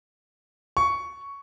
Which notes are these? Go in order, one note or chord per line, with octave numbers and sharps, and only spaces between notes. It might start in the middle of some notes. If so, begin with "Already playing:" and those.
C#6